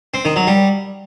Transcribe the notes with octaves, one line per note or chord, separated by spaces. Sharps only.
C4
D#3
F#3
G3